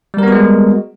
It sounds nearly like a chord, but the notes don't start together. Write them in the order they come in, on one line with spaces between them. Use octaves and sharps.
G3 A#4 B3 F#4 G#3